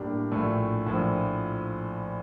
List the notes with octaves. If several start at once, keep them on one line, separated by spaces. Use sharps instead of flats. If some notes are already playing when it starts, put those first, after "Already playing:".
Already playing: A2 G3 A#3 D4 G4
A#1 A2 A3
A#1 A2 F3